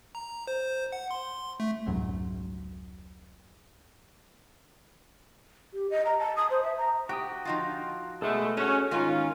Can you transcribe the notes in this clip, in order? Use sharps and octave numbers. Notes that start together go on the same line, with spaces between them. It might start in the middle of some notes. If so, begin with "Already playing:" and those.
A#5
C5
C5
F#5
C6
A3
F1 C#2 G#2 F#3
G4
D#5
A#5
A5
D#6
C5
E5
A#5
F#4 G4 G5 D#6
F3 D#4 F4
B2 G#3 A3 G#4 A4
C#4 F#4
G#2 D#3 A#3 C#4 F4 G#5